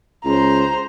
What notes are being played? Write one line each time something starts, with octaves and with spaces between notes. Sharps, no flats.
C#2 C5 A#5